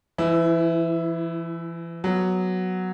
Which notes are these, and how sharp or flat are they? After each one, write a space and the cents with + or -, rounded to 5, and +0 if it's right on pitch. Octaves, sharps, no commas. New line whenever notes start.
E3 +35 E4 +0
F#3 +0 B3 +0